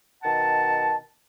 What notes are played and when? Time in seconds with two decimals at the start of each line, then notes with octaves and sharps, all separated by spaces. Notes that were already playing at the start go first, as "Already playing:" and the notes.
0.23 B2 D#3 F#5 A5